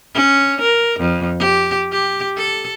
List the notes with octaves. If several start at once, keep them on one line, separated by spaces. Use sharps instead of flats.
C#4
A#4
F2
G4
G4
A4